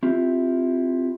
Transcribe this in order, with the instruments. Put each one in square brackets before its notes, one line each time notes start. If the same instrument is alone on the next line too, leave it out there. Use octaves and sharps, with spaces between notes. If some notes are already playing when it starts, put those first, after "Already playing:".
[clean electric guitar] C4 E4 F4 G4